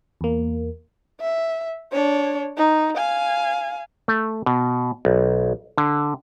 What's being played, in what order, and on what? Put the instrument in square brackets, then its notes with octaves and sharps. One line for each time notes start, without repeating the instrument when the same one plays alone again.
[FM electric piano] E2 A#3
[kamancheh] E5
D4 C#5
D#4
F5 G#5
[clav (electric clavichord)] A3
B2
B1
D3